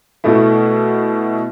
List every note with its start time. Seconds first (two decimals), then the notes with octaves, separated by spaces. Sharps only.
0.24 B2 A3 E4